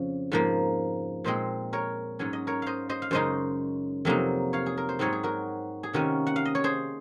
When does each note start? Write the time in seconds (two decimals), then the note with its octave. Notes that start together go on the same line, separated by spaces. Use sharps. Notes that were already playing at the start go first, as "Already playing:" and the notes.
Already playing: F2 C#3 F3
0.32 G#2 F3 A#3
1.24 A#2 G#3 C4 C5 D#5
1.73 A#4 C#5
2.19 G#2 F#3 C#4 C#5
2.33 D#5
2.47 A#4 C#5
2.62 C5 D#5 F5
2.89 C5 D#5
3.02 F5
3.11 F#2 C#3 G#3 D#4 C5 D#5
4.05 F2 C3 F#3 A#3 D#4
4.53 C#5 F5
4.66 G#4
4.78 A#4
4.89 C5
4.99 G#2 F#3 C4 D#4 A#4 C#5
5.13 G#4
5.23 F#4 A#4
5.83 G#4
5.93 C3 D#3 A#3 C#4 F#4 A#4
6.27 F#5
6.36 F5
6.45 D#5
6.55 C#5
6.64 G#4 C5